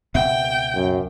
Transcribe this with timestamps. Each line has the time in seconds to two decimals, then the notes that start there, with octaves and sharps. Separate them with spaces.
0.15 C#2 B2 C4 E5 F#5 G5
0.75 F#2